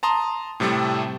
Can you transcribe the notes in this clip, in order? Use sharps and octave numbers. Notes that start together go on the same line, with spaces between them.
A5 A#5 C6 D#6
A2 C3 G3 A3 A4